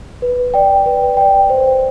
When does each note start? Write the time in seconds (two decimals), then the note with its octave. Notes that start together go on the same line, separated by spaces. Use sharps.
0.22 B4
0.54 D5 G5
0.86 B4
1.17 D5 G5
1.50 C5